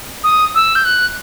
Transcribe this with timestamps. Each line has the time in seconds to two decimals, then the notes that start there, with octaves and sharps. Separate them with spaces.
0.24 D#6
0.55 E6
0.75 G6
0.85 F#6